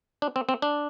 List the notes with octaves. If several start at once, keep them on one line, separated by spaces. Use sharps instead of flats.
D4
C4
C4
D4